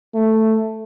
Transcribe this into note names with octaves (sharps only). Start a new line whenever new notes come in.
A3